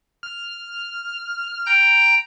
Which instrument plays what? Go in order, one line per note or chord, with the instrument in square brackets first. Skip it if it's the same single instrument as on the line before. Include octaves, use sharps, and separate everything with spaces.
[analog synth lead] F6
[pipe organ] G5 A#5 G6